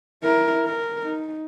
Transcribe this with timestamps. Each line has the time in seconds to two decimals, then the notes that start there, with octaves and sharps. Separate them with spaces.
0.23 E4 A#4
0.65 A#4
1.03 D#4